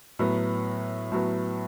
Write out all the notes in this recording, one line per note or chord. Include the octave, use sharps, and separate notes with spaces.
A2 F#3 B3
A2 F#3 B3